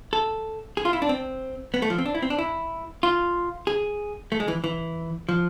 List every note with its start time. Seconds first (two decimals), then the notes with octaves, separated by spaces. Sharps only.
0.13 A4
0.77 G#4
0.85 F4
0.93 E4
1.02 D4
1.09 C4
1.74 B3
1.82 A3
1.90 F3
1.98 C4
2.06 D4
2.15 E4
2.22 C4
2.30 D4
2.39 E4
3.03 F4
3.67 G#4
4.32 A3
4.40 G#3
4.48 E3
4.64 E3
5.29 F3